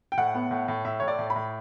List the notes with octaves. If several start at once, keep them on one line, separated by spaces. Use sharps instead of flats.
G5
A2 F#5
B3
A2
A2
A2 E5
A2 C#5
D5
A2
B5
A2